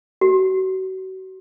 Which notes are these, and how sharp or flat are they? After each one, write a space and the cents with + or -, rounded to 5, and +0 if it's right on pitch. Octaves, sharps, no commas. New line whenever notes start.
F#4 +35